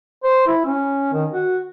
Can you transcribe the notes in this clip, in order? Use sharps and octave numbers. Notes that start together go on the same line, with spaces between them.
C5
E4
C#4
D#3
F#4